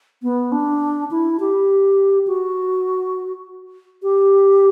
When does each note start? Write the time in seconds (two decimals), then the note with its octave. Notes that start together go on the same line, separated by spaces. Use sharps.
0.23 B3
0.52 D4
1.11 E4
1.40 G4
2.27 F#4
4.03 G4